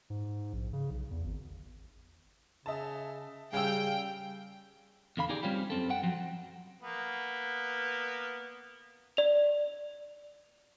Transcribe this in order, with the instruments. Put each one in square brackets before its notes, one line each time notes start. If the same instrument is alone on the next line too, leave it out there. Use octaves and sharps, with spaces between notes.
[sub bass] G#2
A#1
C#3
B1
E2
G#1
[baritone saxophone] C#3 [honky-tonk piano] D#5 E5 A5
[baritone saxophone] C#3 [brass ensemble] G3 [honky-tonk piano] F5 E6 [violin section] G5
[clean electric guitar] E2 D3 F5 B5
D#4 G4 G#4 D5
G3 C4 C#4 F4 G4
F#2 C4 A4
F#5 G5
F3 F#3
[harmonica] A#3 B3
[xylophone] D5 F7